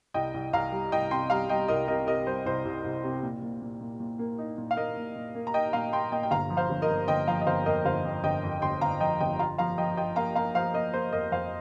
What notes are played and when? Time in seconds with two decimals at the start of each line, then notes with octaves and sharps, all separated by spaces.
0.14 C2 D#5 G5
0.34 C2
0.53 C2 F5 A#5
0.72 G3
0.92 C2 D#5 G5
1.11 C3 G5 C6
1.30 G3 F5 A#5
1.49 G3 D#5 G5
1.68 C2 A#4 D#5
1.88 C3 A#4 D#5
2.07 C3 A#4 D#5
2.26 G3 C5
2.45 C2 C5
2.65 C2
2.84 C2
3.04 C3
3.23 A#2
3.42 A#2
3.62 A#2
3.81 A#2
4.00 A#2
4.19 A#3
4.38 D#4
4.58 A#2
4.71 F5
4.77 A#3 A#4 D#5
4.97 A#2
5.16 A#2
5.35 A#3
5.47 A#5
5.54 D#4 D#5 G5
5.73 A#2 F5 A#5
5.93 A#3 G5 C6
6.12 A#2 D#5 G5
6.23 G5
6.31 G1 F5 A#5
6.50 F3
6.57 C5 F5
6.69 G1
6.82 A#4 D#5
6.89 G1
7.08 G1 D#5 G5
7.28 F3 F5 A#5
7.41 D#5
7.47 G1 C5 F5
7.66 F2 A#4 D#5
7.85 G1 C5 F5
8.05 F2
8.24 G1 D#5 G5
8.44 F2
8.62 G1 G5 C6
8.81 G1 F5 A#5
9.00 F3 D#5 G5
9.21 G1 D#5 G5
9.39 F4 F5 A#5
9.58 F3 F5 A#5
9.78 F3 D#5 G5
9.97 F4 D#5 G5
10.16 A#3 F5 A#5
10.35 A#3 F5 A#5
10.55 F3 C5 F5
10.74 A#3 A#4 D#5
10.94 A#3 C5
11.13 F2 A#4 D#5
11.32 F2 C5 F5